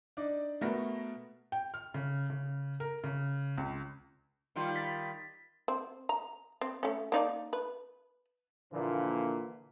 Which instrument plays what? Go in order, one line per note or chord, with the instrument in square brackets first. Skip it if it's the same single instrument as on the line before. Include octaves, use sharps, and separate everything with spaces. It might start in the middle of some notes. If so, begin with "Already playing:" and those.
[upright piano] D4 D#4 D5
B2 A3 F#4 A#4 B4 A#6
[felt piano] G5
F6
C#3
C#3
A#4
C#3
C#2
[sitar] D#3 G3 F4
[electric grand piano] A6 B6
[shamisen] C4
A#5
C4
A3 C#4
A#3 D#4 D5
B4
[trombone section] A#2 D3 E3 F3 A#3